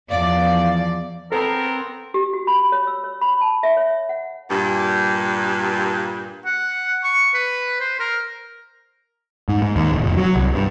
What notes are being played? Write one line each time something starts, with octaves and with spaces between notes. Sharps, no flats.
E2 F3 D5 F5
B3 C4 A4 A#4 C5 A#5
G4
F#4
B5
C#5
E6
C#5
B5
A5
E5
C#5
F#5
G2 A#2
F#5
C#6
B4
C5
A#4
G#2
G#2
D#2
D1
F1
F#3
C2
G2